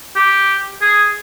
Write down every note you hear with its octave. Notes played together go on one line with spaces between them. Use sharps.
G4
G#4